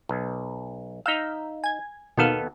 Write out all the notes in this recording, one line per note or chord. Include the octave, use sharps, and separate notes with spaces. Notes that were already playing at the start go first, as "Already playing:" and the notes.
B1
D#4 F5 E6 G6 B6
G#5 G#6
D#2 B2 D#3 B3 A4 F5